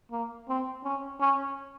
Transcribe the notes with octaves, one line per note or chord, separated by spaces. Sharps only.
A#3
C4
C#4
C#4